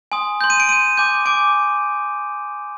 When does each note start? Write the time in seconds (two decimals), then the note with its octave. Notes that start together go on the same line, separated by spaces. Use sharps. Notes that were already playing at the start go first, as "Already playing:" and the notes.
0.12 G#5 C6 D#6
0.41 C6 G6
0.50 D#7
0.60 D7
0.69 C6 G6 D#7
0.97 G#5 D6 G6
1.25 G#5 D6 D7